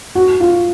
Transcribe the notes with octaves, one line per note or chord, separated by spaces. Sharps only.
F#4
F4